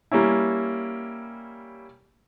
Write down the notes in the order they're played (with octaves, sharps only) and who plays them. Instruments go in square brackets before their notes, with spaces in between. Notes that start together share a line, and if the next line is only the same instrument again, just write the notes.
[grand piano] G3 A#3 C#4 E4